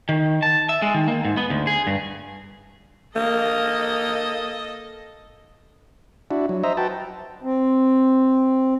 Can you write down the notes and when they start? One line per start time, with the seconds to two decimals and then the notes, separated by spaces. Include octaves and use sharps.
0.09 D#3
0.42 A5
0.69 E5
0.82 G#3
0.94 D#3
1.08 A#3
1.25 G#2
1.37 B3
1.50 D2
1.67 G#4
1.87 G2
3.15 A#3 A4 D#5
6.31 D4 E4 F#4
6.49 F#3
6.64 C5 D#5 E5 A#5
6.77 F#4 B4 G5 A5
7.43 C4